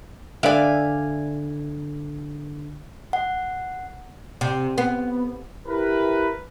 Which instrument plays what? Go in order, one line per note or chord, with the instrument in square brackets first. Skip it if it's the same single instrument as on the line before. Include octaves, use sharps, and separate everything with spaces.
[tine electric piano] D3 [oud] B4 D5 E5 [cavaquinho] F5 G#5
[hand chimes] F#5
[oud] C3
B3
[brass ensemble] E4 G4 A#4 B4